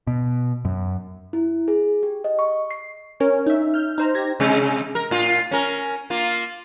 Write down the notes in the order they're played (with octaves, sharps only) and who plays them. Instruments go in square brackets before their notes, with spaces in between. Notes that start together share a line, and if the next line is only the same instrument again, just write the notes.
[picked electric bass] B2
F#2
[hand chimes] E4
G#4
G4
D#5
C#6
C7
[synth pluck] C#4 A#4 C#5
D#4 E5
F6 G6
D#4 C5 A#5
D#4 G4 G#6 A#6
[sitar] C3 G#3
A#4
A2 F4
C#4 A#4
A#3 F4